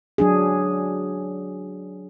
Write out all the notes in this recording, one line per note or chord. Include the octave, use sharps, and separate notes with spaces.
F#3 D4 G#4